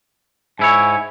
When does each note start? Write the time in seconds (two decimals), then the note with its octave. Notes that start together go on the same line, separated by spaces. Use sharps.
0.59 G#2 E4 C#5 G#5